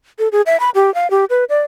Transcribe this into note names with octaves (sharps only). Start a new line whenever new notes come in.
A4
G#4
E5
B5
G4
F5
G4
B4
D5